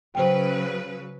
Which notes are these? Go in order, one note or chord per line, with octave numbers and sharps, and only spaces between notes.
C#3 F#3 B4 C5 G5